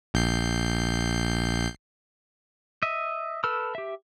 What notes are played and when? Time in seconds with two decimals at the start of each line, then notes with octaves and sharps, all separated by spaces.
0.14 A#1 G6 C7
2.83 D#5 E5
3.44 A4 B4 E6 F6
3.75 G4 E5